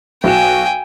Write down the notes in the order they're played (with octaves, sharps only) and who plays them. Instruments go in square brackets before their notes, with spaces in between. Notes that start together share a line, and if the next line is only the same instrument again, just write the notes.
[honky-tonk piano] B1 F#4 E7 [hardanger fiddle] G5 G#5